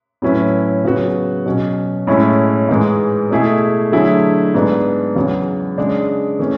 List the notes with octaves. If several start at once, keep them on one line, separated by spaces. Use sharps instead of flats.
A2 F#3 C#4 E4 B4
C#3 F#3 B3 F#4
B2 F#3 C#4
A2 G#3 C#4 E4
G#2 E3 G#3
B2 A3 E4 G#4
D3 F#3 A3 E4 G#4
G#2 G#3 B3 D4
E2 C#3 F#3
C#3 G#3 D4
E3 A3 C#4